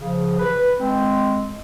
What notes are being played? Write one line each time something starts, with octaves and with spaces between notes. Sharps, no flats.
C#3 F3
B4
G#3 C4